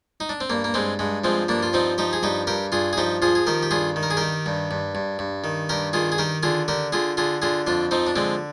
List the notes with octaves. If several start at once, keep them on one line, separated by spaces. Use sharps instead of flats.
D#4
D4
C4
G2 A#3
A#3
G2 G#3 C4
G2 G#3
F3 G#3 C4
G2 A#3 D4
F4
F3 C4 D#4
F3 D#4 G4
G#4
G2 D#4 G4
G2 G4 A#4
G2 F4 G#4
G#4
F3 D#4 G4
F3 F4 G#4
G#4
D#3 G4 A#4
G4
G2 F4 G#4
D#3
A#4
G#4
D#3 G4 A#4
G2
G2
G2
G2
D#3
G2 G4 A#4
D#3 F4 G#4
G#4
D#3 G4 A#4
D3 F4 G#4
D3 G4 A#4
D3 F4 G#4
D3 F4 G#4
D3 F4 G#4
F2 D4 F4
F3 C4 D#4
D4
D3 G#3 C4